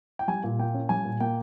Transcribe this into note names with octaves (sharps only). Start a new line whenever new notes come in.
G5
G3 G#5
A#2
A#3 G5
C#4
G3 G#5
A#2
A#3 G5